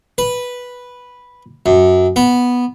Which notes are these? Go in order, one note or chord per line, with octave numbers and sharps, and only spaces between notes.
B4
F#2
B3